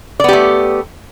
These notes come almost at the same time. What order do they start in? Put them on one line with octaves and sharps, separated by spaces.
D5 B3 G4 A3